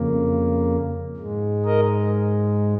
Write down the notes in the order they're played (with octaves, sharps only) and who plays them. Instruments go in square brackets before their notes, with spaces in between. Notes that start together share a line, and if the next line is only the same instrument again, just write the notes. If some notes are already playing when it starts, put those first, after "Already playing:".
Already playing: [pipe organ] F2 C#3 A#3
G#2 G#3
A#4 D#5